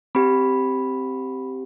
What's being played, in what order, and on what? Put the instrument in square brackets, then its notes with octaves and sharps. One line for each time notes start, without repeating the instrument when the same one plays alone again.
[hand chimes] C4 G4 B5